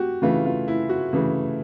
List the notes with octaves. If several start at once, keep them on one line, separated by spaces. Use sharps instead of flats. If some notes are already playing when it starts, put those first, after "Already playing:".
Already playing: F#4 G4
C#3 E3 A3 F4
F4
E4
F#4
C#3 E3 A3